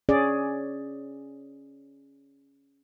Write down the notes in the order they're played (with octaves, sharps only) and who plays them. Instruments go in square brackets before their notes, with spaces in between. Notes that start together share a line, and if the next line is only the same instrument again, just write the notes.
[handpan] C#4 G#4 D5